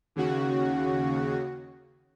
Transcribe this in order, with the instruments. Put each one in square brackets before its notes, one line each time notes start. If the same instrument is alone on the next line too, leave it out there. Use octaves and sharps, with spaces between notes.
[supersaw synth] D#2 C#3 F#4